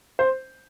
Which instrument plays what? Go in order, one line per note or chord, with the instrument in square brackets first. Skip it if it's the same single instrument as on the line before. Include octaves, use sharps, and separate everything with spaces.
[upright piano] C5